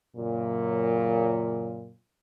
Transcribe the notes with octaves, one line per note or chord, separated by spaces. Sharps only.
F#2 A#2 C#3